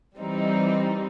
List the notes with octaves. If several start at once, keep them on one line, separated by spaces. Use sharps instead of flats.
E3 G3 C4 D#4